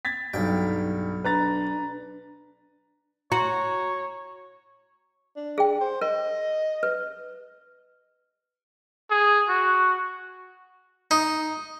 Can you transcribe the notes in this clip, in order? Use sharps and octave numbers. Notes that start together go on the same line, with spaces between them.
G#6 A6 B6
B1 G2 D#4 G5
D4 B4 A#5 A6
F#4 C#5 A#5
D4
G#4 G5
C5
A#4 D#5
B4
G#4
F#4
D#4